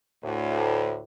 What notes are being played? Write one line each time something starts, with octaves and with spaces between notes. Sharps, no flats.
D2 A2